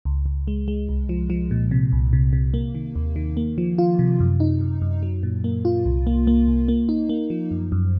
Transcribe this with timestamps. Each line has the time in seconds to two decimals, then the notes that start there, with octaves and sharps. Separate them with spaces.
0.05 C#2
0.26 C#2
0.48 G#3
0.68 G#3
0.89 C2
1.09 F3
1.30 F3
1.51 A#2
1.71 C3
1.92 C2
2.13 C3
2.33 C3
2.54 A#3
2.75 D#3
2.95 D#2
3.16 D#3
3.37 A#3
3.58 F3
3.78 F4
3.99 C3
4.20 F#2
4.40 D#4
4.61 F#2
4.82 F#2
5.03 F#3
5.23 A#2
5.44 A#3
5.65 F4
5.86 C2
6.07 A#3
6.27 A#3
6.48 C2
6.68 A#3
6.89 D#4
7.09 A#3
7.30 F3
7.51 F#2
7.72 F#2